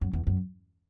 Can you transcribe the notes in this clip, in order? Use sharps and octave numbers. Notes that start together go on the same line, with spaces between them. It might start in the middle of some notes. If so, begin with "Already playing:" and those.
F#2
E2
F#2